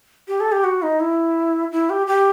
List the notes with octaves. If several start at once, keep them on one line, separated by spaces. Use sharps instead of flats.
G4
A4
G4
F#4
D#4
E4
E4
G4
G4